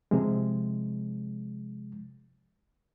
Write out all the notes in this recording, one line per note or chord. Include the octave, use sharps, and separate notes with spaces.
C3 F3 G#3